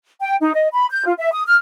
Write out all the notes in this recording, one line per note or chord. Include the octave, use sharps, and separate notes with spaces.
G5
D#4
D#5
B5
G6
F4
E5
D#6
F6